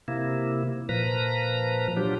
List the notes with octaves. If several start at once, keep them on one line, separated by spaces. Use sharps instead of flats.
C3 A#3 E4
A#2 F3 B4 A#5
F#3 D4 F4 G4